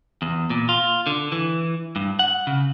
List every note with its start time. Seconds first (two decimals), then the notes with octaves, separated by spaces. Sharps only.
0.22 E2
0.50 A#2
0.69 F4
1.07 D3
1.32 E3
1.96 G2
2.19 F#5
2.47 C#3